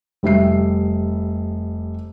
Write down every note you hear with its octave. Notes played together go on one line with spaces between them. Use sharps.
F1 G3 E5 C7